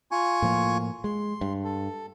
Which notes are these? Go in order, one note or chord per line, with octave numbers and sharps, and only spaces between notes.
F4 G#5 C#6
A2 F3 A#3
G#3 C6
G2
A4